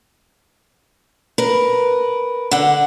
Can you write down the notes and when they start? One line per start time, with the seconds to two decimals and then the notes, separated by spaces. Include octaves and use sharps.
1.38 A#4 B4
2.51 D3 F#5